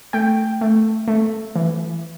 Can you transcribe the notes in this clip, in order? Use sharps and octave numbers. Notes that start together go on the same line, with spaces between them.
A3 G5
A3
A3
E3